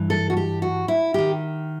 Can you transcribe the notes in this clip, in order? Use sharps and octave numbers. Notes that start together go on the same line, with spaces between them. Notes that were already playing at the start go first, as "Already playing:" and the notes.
Already playing: G2 E3
A4
F#4
G4
F#4
E4
D#3 G4